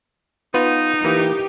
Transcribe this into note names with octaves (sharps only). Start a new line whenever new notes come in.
B3 D#4 F4 B4
E3 A#3 G4